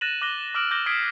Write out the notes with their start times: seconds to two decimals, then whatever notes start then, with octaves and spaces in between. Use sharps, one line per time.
0.01 F#6 A6 A#6 D#7 E7 F#7
0.22 D6 F#6 A#6 G7
0.55 D6 E6 F6 A#6 D7 F#7
0.71 D6 G6 A#6 G7
0.86 D#6 F6 G#6 B6 C7 D7